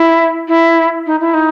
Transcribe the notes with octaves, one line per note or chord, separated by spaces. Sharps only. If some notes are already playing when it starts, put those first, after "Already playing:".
Already playing: E4
E4
D#4
E4
D#4